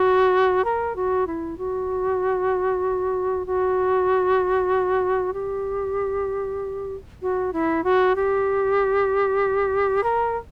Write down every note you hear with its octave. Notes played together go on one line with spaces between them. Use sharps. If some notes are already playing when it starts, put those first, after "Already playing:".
Already playing: F#4
A#4
F#4
E4
F#4
F#4
G4
F#4
E4
F#4
G4
A#4